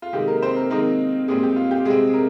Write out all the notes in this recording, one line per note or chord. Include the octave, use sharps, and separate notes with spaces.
F4
C3 D#3 G#3 G4
A#3 A#4
C4 C5
A#3 A#4
D#3 G#3 A#3 C4 D#4 A#4
A#2 G3 G#3 C4 G#4
G4
F4
G4
C3 G3 G#3 C4 G#4
G#4
A#4